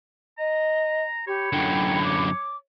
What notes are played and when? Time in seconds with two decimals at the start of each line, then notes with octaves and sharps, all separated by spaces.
0.38 D#5 A#5
1.27 G4 C#5 B5
1.52 F#2 D3 G5
2.04 D6